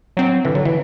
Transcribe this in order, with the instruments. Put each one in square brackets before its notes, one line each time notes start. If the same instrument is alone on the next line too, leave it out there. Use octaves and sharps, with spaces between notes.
[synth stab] F#3 C4
[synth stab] D3 [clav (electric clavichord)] E3
[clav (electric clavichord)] F#3
E3